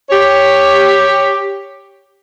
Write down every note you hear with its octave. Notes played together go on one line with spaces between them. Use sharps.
G4 C#5